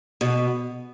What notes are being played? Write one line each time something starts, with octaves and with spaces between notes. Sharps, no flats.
B2